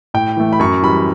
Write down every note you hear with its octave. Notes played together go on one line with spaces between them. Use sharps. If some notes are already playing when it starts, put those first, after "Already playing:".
A2 G5
E3 A3
B5
F#2 C#6
E3 G3 B5